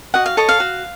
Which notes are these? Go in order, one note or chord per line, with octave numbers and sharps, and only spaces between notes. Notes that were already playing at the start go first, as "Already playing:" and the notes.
F#4 D#5 F#5
F5
A4 C#5 D#5
F5
F#4